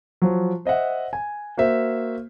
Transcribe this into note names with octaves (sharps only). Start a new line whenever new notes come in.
F3 F#3
C5 D#5 E5 F#5
G#5
A#3 F#4 C5 E5